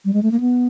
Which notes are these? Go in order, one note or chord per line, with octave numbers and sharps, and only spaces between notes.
G3
G#3
A3
A#3
B3